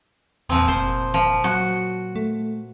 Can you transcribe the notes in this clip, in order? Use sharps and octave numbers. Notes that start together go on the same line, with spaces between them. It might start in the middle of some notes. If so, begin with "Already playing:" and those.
E2 A#2 F3 C4
F1 C5
F3
F#3 F#4
A3